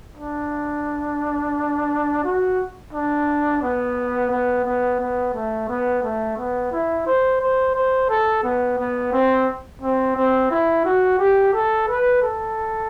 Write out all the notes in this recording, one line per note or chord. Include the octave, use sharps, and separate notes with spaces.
D4
F#4
D4
B3
B3
B3
B3
A3
B3
A3
B3
E4
C5
C5
C5
A4
B3
B3
C4
C4
C4
E4
F#4
G4
A4
B4
A4